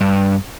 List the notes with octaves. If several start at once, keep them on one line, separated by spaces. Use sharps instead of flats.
G2